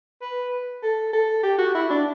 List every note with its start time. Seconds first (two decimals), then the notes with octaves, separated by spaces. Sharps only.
0.21 B4
0.83 A4
1.13 A4
1.43 G4
1.58 F#4
1.74 E4
1.90 D4